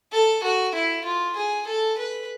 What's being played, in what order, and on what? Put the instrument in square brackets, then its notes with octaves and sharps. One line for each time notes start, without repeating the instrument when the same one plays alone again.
[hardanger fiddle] A4
F#4
E4
F4
G#4
A4
B4